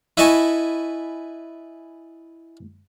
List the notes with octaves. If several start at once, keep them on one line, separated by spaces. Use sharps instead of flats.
E4 B4 D#5 G#5 A5 C#6